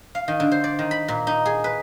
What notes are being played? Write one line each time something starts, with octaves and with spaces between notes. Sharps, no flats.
F5
D#3
D3
C5
D5
D#3
B5
A#2
D#4
G#4
B4